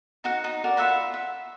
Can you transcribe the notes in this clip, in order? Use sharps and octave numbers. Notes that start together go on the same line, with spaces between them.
D#4 F#4 F#5
D#4
F#4 A#4 D5
F4 E5 F#5 B5
E5